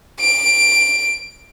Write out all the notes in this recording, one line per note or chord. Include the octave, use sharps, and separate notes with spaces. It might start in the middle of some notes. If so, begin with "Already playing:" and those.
D7